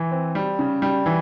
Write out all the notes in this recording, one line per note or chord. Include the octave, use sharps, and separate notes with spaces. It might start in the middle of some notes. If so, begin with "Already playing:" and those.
Already playing: E3
C4
G3
C#3
G3
E3